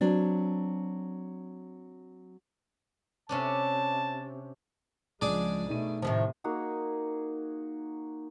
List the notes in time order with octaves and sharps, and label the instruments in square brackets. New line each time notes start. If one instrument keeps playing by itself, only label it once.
[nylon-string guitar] F#3 C4 D4
[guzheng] C3 C#4 D4 [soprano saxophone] A5
[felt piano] C#2 [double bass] F3 G#3 [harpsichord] D4 G#4 D5
[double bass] B2 A3 [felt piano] D#4 D#7
[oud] A2 D#3 F3 [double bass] C3 [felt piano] A5
[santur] A#3 D#4 F#4 G#4